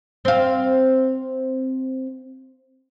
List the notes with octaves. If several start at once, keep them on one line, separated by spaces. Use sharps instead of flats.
C4 F5